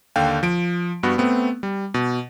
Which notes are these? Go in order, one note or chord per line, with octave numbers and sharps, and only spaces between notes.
D#2 D3 F5 G5
F3 D7
G2 B3 F#4
A3 B3 C4
G3
B2